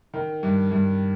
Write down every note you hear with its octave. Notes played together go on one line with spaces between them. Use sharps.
D#3
G2
G2